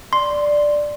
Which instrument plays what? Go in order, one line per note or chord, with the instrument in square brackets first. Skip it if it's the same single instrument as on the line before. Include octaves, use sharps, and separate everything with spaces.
[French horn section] D5 [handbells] C6